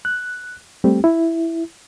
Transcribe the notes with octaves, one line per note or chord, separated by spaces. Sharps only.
F#6
G3 A3 C4 G4
E4